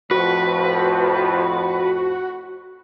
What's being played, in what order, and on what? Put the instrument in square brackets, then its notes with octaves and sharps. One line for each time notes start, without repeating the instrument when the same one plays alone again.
[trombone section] F2 A2 F3 [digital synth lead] F#4 [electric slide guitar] B4